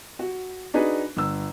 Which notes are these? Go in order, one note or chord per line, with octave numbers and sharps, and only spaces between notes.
F#4
D4 D#4 F#4 G#4 B4
G1 E6